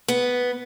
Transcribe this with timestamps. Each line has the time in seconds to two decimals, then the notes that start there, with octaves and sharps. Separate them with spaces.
0.08 B3